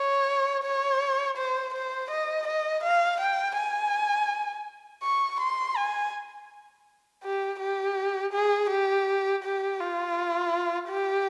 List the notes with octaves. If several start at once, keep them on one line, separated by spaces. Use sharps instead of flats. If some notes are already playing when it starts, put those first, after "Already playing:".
Already playing: C#5
C#5
C5
C5
D#5
D#5
F5
G5
G#5
C#6
C6
G#5
G4
G4
G#4
G4
G4
F4
G4